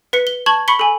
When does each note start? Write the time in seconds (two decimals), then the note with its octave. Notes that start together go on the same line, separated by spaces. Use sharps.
0.13 B4 B6 C#7
0.27 G7
0.46 A5 C#6 G#6 F#7
0.68 B5 C#6 B6 C#7 G7
0.79 A4 G#5